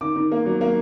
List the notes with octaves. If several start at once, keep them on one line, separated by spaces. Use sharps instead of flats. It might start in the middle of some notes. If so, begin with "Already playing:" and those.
D#3 D6
D#3
A#3
F#3
A#3